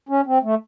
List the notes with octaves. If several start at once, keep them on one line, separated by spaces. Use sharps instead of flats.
C#4
C4
A3